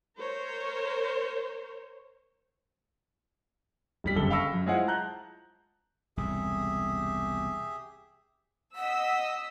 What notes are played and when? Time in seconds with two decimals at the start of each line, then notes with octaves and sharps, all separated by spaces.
0.18 A#4 C5 C#5
4.04 E1 G3 B6
4.16 F#1 D3 A4 G7
4.30 F5 G5 B5 C#6 E6 A#6
4.53 F#2
4.66 G#3 E4 F4 G#4 C5 F#5
4.87 A5 A#5 F#6 G6
6.17 E1 C2 A2 G4 G#4 E5
8.76 D#5 F#5 E6 B6